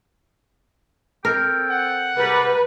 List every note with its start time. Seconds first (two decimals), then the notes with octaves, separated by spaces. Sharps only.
1.25 C4 A4 A#4 G5
1.70 F#5
2.17 G#2 C3 G3 B4